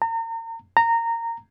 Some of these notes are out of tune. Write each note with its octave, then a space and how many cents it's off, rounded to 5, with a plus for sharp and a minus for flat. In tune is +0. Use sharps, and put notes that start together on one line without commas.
A#5 -35
A#5 -15